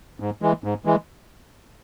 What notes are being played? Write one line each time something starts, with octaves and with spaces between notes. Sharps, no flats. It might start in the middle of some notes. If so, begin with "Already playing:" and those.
G#2
E3 G#3
G#2
E3 G#3